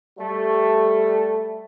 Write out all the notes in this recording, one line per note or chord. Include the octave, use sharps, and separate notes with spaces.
G3 A3